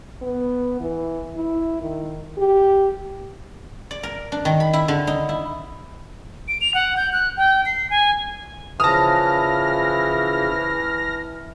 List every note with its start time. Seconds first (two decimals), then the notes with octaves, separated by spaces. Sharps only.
0.22 B3
0.80 E3
1.37 E4
1.82 D#3
2.38 G4
3.91 D5
4.03 A#4
4.32 D4
4.45 D#3
4.60 B5
4.73 E4
4.88 D3
5.07 D#4
5.29 E4
6.48 D7
6.61 F7
6.74 F#5
6.97 G6
7.13 F#6
7.37 G5
7.66 C7
7.90 G#5
8.80 C#3 E3 F3 A5 D#6 F6 A#6